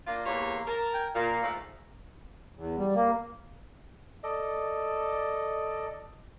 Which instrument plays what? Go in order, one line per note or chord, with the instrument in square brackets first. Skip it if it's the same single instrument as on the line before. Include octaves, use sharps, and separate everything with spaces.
[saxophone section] A#3 D4 F4
[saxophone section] E2 G4 C#5 [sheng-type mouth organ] A#3 C6
[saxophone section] A#4 [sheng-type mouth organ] A5
[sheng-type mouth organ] G5 G#5
[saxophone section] A#2 [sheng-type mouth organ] F5 A#5
[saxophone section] G#2 F3 A3
[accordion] E2
G3
A#3
[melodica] A4 D5 D#5